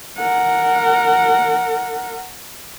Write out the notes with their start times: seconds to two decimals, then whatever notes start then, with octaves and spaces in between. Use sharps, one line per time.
0.17 A#4 F#5